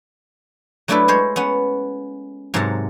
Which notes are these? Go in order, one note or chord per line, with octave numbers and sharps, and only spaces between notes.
F#3 A3 D4 E4 A4 B4
G#3 C5 C#5
B3 C#4 F#5
G#2 C3 F#3 A#4 F#5 A5